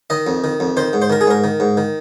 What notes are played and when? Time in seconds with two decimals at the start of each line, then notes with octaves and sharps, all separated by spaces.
0.10 D#3 D#5
0.27 F2
0.44 D#3
0.60 F2
0.77 D#3 C5
0.93 G#2
1.02 C5
1.10 D#3 A#4
1.21 G#4
1.27 G#2 A#4
1.44 D#3
1.60 G#2
1.77 D#3